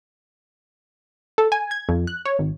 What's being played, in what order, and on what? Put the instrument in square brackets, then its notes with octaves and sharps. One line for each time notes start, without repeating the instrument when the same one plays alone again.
[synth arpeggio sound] A4
G#5
G#6
F2
F#6
C#5
G#1